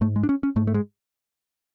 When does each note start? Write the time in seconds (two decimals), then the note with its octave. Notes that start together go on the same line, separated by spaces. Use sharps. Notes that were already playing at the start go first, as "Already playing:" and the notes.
0.01 G#2 A3
0.16 G#3
0.23 D4
0.29 C#4
0.43 C#4
0.56 G#2 A3
0.67 A3
0.74 G#3